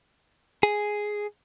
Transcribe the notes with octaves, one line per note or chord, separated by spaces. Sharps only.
G#4